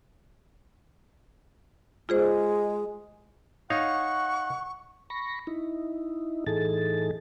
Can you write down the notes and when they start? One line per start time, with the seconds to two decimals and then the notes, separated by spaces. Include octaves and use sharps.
2.09 G#3 F4 G#4 C5
3.70 D#4 C#5 F5 F#5 C#6
5.10 B5 C#6 A#6
5.47 D#4 E4
6.47 A2 E3 D#4 G#4 A4 A6